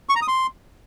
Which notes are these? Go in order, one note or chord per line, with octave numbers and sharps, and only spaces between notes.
C#6
A#5
D#6
C6